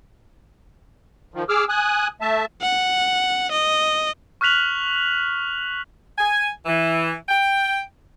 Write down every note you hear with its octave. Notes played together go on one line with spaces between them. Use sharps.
D#3 F3
G#4 D6 E6 F6
G#5 D#6 F#6
A3 E5 A5
F#5
D#5
C#6 F6 F#6 B6 F7 F#7
G#5
E3
G5